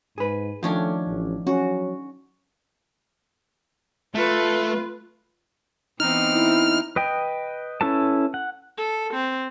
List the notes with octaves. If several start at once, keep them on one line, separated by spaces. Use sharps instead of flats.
G#2 G#4 B4
D#3 F3 A3 C#4 D4
A1
F#3 C#4 F#4
A3 F4 B4
E3 B3 C4 D#4 F6
E4
B4 D#5 G5
C#4 E4 A4 B4 A5
F#5
A4
C4